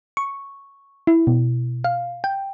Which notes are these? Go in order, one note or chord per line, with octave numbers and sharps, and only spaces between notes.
C#6
E4
B2
F5
G5